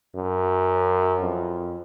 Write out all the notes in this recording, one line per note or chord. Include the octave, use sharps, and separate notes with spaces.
F#2
F2